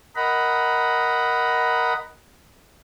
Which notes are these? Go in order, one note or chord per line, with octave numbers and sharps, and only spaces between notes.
A#4 D#5 F#5 A#5 B5